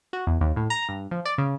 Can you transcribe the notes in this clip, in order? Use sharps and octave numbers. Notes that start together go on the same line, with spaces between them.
F#4
E2
D#2
A2
A#5
G2
F3
D5
C#3